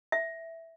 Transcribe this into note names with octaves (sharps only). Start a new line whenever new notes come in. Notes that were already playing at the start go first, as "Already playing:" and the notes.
E5